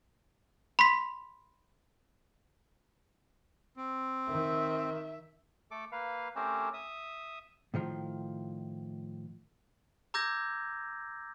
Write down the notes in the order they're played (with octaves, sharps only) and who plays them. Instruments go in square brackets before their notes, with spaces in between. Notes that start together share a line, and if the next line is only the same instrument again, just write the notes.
[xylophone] B5 C6 B6
[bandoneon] C4
[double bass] D#3 [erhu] E5
[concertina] A3 A4 D6
A#3 B4 F5
A3 C4 C#4 G4 A#4 C5
E5 D#6
[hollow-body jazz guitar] A2 D#3 F3
[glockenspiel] A#5 D6 E6 G6 G#6 A#6